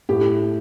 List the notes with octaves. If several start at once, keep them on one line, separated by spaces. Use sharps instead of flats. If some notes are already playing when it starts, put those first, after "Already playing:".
A2 G4